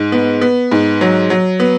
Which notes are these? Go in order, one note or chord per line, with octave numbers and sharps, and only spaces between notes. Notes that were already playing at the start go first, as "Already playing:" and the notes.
Already playing: G#2
B3
B3
G#2
F#3
F#3
B3